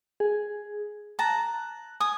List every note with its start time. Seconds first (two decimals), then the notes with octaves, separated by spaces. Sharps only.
0.20 G#4
1.19 A5 A#5 F#6
2.00 G#5 D#6